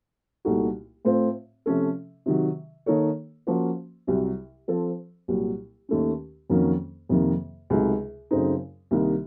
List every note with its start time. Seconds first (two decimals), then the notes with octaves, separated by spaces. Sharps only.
0.45 C2 A#2 A3 D#4 F#4
1.05 A2 A3 C4 F4 C5
1.66 C3 F3 A3 C#4 A4
2.26 C3 D#3 F#3
2.86 D#3 A#3 D#4 A4 C#5
3.47 F3 A#3 C#4 F#4 C5
4.07 C2 C3 F#3
4.68 F3 C4 F4 A4 C5
5.28 C2 A#2 F#3
5.89 D#2 D#3 A3 C#4
6.50 F2 D#3 F#3 A#3 C#4
7.09 F2 C3 D#3 A#3
7.70 C#2 C3 F#3 A3 D#4
8.31 F#2 C#3 A3 C4 D#4
8.91 C2 C3 D#3 A#3 D#4